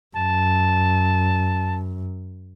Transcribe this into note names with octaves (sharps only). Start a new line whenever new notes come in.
F#2 A5